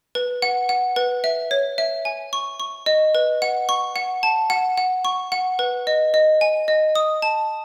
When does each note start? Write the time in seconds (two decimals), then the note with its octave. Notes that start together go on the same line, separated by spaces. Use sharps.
0.15 B4
0.42 F#5
0.69 F#5
0.96 B4
1.24 E5
1.51 C#5
1.78 E5
2.05 G#5
2.33 C#6
2.60 C#6
2.86 D#5
3.15 B4
3.42 F#5
3.69 C#6
3.96 F#5
4.23 A5
4.50 F#5
4.77 F#5
5.05 C#6
5.32 F#5
5.59 B4
5.87 D#5
6.14 D#5
6.41 G#5
6.68 D#5
6.95 D#6
7.22 A5